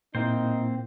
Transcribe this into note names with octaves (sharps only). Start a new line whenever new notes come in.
A#2 A#3 C4 D#4 E4 C5